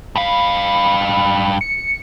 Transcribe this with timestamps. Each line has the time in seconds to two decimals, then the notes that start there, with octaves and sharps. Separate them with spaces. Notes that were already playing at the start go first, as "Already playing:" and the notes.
0.16 G2 F5 B5
1.61 C#7